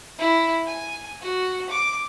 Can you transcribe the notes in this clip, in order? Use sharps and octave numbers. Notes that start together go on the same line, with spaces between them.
E4
G#5
F#4
D6